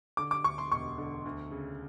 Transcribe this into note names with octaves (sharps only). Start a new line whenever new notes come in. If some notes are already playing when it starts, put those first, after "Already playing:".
D3 D6
D6
D2 C#6
C6
E1 C#6
D3
D2
C#3